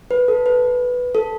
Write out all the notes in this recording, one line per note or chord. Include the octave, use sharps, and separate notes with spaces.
B4
A4
B4
A4